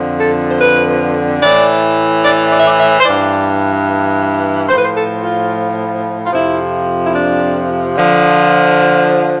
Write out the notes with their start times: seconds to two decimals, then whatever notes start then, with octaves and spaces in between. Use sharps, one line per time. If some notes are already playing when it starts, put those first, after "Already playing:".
Already playing: F2 D3 F3
0.19 A4
0.50 C5
0.59 B4
1.41 A2 E3 D5
2.23 D5
2.50 D5
2.59 E5
2.67 D5
2.78 E5
3.00 C5
3.04 G2 E3 D5
4.69 A2 F3 C5
4.77 B4
4.84 C5
4.96 A4
5.23 F4
6.26 F4
6.33 F2 C3 F3 E4
7.05 E4
7.14 D4
7.97 D3 F3